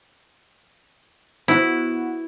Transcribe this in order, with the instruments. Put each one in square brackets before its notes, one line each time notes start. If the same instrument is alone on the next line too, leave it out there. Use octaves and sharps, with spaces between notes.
[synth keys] B3 F#4 [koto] E4